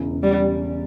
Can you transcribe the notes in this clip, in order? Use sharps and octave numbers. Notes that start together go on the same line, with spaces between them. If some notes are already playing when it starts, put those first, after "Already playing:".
Already playing: E1 E2 C#3
G3